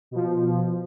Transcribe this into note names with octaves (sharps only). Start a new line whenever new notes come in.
B2 F3